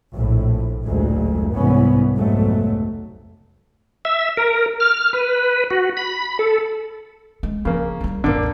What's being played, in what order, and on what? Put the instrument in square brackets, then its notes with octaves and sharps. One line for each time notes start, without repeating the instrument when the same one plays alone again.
[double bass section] A#1 A2
F#1 D2 A#2 G#3
C2 G#2 E3 B3 C#4
F1 B1 G#2 F#3 A3
[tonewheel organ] E5
A#4
F6
B4
F#4
B5
A4
[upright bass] G#3
[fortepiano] C#3 A#3 [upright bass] F3
[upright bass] G3 E4
[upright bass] A1 E2 [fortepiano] D3 A#3